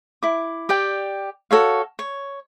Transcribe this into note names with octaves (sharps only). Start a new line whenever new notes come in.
E4 D6
G4 D5 G5
F#4 A4 C#5 F5
C#5